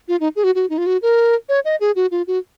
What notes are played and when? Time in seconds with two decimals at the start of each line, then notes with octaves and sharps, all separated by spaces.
0.08 F4
0.20 D#4
0.36 G#4
0.44 F#4
0.55 F#4
0.70 D#4
0.78 F4
0.86 F#4
1.02 A#4
1.49 C#5
1.65 D#5
1.81 G#4
1.96 F#4
2.11 F4
2.27 F#4